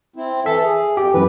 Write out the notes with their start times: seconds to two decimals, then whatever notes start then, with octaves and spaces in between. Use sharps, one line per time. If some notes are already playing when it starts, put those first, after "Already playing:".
0.16 C4 E4
0.46 E3 A4 E5
0.63 G#4
0.97 F2 G4
1.14 F#2 E3 B4